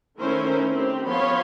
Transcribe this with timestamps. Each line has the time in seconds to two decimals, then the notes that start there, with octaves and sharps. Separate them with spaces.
0.20 D#3 A3 C#4 E4 A#4 C5
0.73 C4 G4
1.08 F3 B3 C#5 F5 B5 C6